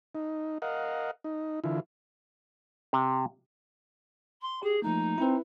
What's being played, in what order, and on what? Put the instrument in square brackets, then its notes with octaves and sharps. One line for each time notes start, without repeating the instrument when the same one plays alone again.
[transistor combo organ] D#4
A#4 D#5 F5 F#5
D#4
D3 E3 E4 F4
[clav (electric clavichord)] C3
[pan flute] C6
[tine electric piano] G4 [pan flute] G#4
[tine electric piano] F3 A3 A#3 [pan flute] D#4
[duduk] C4 [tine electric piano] E4 B4